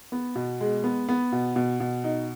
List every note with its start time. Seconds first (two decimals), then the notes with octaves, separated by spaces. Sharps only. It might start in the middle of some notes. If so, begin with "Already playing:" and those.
0.12 B3
0.35 B2
0.61 G#3
0.84 B3
1.09 B3
1.32 B2
1.56 B2
1.80 B2
2.04 D#4